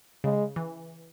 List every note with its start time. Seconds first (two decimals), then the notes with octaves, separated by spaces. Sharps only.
0.24 C#3 G#3
0.56 E3